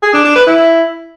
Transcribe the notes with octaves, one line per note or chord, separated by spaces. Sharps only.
G#4
D4
D4
B4
E4